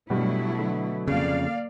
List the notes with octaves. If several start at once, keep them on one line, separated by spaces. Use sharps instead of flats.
G2 B2 F#3 G3 A3 E4
D3
F2 C#3 A#3 D5 F5